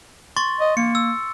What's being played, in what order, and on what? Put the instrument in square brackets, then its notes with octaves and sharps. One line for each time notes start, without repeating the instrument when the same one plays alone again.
[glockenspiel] C6 C#6 A6
[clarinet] D#5
[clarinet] A#3 [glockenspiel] C#7
[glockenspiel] E6